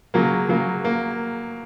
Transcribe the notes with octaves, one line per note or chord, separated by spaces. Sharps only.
C#3 F#3 A#3
C#3 F#3 A#3
A#3